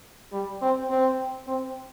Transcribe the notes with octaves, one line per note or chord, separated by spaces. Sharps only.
G3
C4
C4
C4